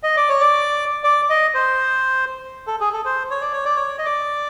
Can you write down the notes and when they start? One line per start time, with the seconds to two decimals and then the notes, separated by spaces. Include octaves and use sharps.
0.03 D#5
0.17 D5
0.29 C#5
0.41 D5
1.04 D5
1.30 D#5
1.54 C5
2.67 A4
2.80 G#4
2.93 A4
3.05 C5
3.31 C#5
3.41 D5
3.53 C#5
3.65 D5
3.76 C#5
3.98 D#5
4.05 D5